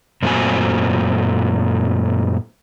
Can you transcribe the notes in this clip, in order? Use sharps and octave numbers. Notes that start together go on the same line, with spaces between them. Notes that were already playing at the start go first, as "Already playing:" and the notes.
F#2 A#2 A3 C4 F#4 G#5